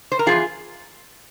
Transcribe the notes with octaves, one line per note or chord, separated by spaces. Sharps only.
C5
A#4
E2 C#3 F3 F4 G#4